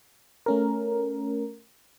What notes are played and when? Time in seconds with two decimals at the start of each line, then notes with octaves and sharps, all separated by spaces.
0.46 A3 C#4 A#4